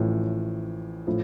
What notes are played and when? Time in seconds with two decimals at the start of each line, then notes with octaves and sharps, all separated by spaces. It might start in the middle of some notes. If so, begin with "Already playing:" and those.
Already playing: A1 A2 F3
1.07 A2 F3